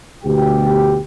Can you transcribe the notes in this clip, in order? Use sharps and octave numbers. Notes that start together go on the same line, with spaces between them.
D2 B2 G4 G5